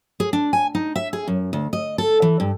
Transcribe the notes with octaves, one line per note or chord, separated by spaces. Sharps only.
G#4
D4
G#5
D#4
E5
G#4
F#2
D2
D#5
A4
E3
G2